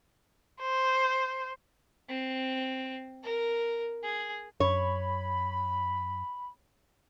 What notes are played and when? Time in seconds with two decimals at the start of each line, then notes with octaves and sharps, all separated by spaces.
0.61 C5
2.09 C4
3.23 A#4
4.03 G#4
4.60 F#2 C#5 B5